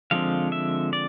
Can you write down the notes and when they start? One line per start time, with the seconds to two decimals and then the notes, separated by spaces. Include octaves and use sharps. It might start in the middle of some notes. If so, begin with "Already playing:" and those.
0.11 D3 F3 G#3 C4 F5
0.52 E5
0.93 D5